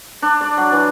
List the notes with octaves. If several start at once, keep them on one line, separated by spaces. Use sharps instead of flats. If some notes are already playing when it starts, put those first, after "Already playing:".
D4
D5
F#3
E3